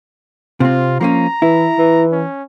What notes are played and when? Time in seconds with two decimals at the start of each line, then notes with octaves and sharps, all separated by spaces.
0.60 C3 C4 F4
1.01 F3 A#3 C#4 A#5
1.42 E3 E4
1.79 E3
2.12 C#4